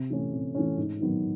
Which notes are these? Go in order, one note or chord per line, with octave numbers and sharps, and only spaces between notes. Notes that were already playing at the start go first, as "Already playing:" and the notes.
Already playing: C3
E3 A3 C#4
C3
E3 A3 C#4
G#2
D#3 F#3 B3